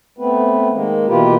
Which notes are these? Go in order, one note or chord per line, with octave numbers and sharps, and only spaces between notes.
A3 B3 C4 B4
D#3 G#3 A#3
B2 E3 A#3 F4 G4 B4